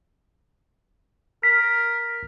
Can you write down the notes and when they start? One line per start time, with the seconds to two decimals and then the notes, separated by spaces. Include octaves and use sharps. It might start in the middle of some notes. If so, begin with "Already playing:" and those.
1.43 A#4 B6